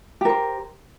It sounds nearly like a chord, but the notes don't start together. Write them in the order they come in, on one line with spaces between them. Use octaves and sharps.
G4 A#4 C5